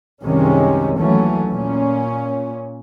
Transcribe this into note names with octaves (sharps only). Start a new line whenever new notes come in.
C2 F#2 C3 D#3 G#3 C#4
D#2 E3 F#3 A3 C#4
A#2 C#4